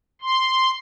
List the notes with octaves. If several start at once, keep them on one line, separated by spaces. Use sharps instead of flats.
C6